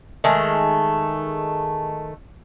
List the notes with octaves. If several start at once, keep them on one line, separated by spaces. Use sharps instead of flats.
D#3 G#3 A3